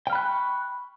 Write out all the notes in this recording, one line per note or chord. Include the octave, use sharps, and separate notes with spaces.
G5 B5 C#6 F6 F#6